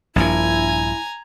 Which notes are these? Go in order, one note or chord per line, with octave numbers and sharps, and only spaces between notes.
A#1 G2 A#2 E4 G#5 A#5